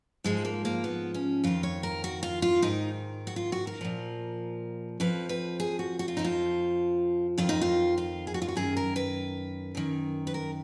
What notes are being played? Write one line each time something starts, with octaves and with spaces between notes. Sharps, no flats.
G#2 F3 G#3
A#3
A#3
B3
C#4
F2 D#3 F4
C#5
A#4
F#4
F4
F4
G#2 D#3 D#4
F#4
F4
F#4
A#4
A#2 F3
F2 F3 B4
B4
G#4
F#4
F#4
F4
F2 F3 D#4
F4
F2 D#3 F4
D#4
F4
F4
G#4
F#4
F4
F#4
F#2 D#3 G#4
A#4
B4
F#2 D#3
B4
A#4